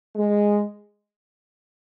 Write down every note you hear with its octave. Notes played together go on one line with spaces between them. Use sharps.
G#3